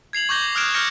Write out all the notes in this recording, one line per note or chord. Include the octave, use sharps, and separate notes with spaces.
G#6 C7 F7 F#7
C#6 D6 G6 A#6 G7
D#6 F6 F#6 G#6 D7 E7
D6 F6 G6 A#6 C#7 D7